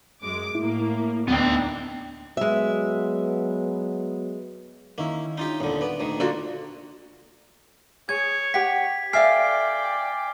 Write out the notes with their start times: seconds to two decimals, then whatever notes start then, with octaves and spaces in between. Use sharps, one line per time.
0.22 F#2 G#3 D6
0.55 A2 A#3 E4
1.28 D2 A3 B3 D4 D#4 G5
2.37 F#3 G#3 B3 E5
4.98 D#3 A#3 C#4 E4
5.38 D4 D#4 F4 G4
5.60 D#2 A#2 D3 B3 D4
5.81 B3 D5
6.00 D2 D#3
6.20 D3 A#3 D4 F4 F#4 F#5
8.09 G#4 C#5 G#6
8.54 G4 F#5 G5 B6
9.13 A4 D5 E5 F5 G5 G#5 F6 C7